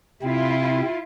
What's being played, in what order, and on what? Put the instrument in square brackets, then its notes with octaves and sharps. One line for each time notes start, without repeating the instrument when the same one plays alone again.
[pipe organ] C3 C4 [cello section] E4 F4